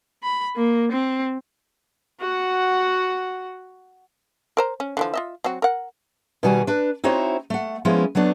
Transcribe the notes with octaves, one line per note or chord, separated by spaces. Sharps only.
B5
A#3
C4
F#4 F#5
A#4 C5 A#5
C#4
D3 E3 F3
F4 D#5 E5
F#3 C4 F#4
A#4 F#5
B2 D#3 G3 F#4 G#5
D4 B4
C4 D#4 E4 F#4 C5 C#5
A3 F#5
F3 G#3 B3 C#4 E4
F#3 A3 B3 D4